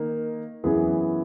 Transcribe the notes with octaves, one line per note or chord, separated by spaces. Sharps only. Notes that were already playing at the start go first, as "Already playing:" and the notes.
Already playing: D#3 A#3 D#4
F#2 E3 B3 E4 G#4